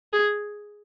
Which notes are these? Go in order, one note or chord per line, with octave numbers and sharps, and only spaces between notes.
G#4